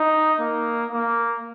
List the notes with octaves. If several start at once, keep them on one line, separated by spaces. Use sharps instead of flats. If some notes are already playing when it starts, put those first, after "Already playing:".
Already playing: D#4
A#3
A#3